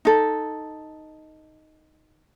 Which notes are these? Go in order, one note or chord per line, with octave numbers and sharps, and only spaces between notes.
D#4 A4